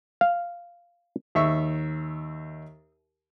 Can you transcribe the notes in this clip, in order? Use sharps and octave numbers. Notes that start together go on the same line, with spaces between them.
F5
D#2 E5 C#6